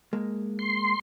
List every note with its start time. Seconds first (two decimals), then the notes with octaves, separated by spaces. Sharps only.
0.13 G#3 A#3
0.59 C6